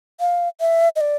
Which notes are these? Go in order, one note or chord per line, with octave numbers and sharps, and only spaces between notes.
F5
E5
D#5
D5